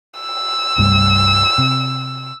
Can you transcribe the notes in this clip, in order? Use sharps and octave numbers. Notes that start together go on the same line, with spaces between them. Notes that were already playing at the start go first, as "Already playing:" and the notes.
E6
C2 G2 A3
C3